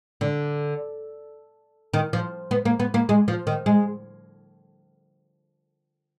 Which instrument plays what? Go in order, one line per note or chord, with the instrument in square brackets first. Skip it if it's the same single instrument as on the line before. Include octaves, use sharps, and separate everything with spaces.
[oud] D3
D#3
F3
B3
A#3
B3
A#3
G#3
F3
D#3
G#3